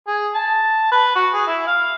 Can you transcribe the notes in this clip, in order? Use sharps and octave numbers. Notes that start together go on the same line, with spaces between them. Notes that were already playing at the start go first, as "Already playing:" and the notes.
G#4
A5
B4
F#4
G#4
E4
F5